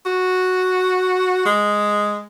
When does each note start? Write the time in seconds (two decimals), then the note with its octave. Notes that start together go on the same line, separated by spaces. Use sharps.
0.06 F#4
1.46 G#3